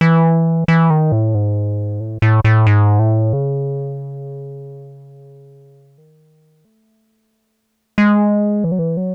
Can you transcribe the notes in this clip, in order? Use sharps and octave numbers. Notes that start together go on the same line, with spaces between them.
E3
E3
D#3
A2
G#2
A2
A2
A2
G#2
A2
C#3
D#3
A3
G#3
E3
F#3
E3
F#3